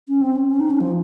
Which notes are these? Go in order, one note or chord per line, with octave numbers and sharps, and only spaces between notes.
C#4
C4
C#4
C#4
D#4
C#4
F3